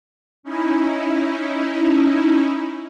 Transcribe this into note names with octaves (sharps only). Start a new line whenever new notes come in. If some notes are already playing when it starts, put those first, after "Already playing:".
C#4 D#4 E4